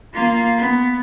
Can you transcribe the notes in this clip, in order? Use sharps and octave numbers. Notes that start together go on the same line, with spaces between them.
A#3 F4
B3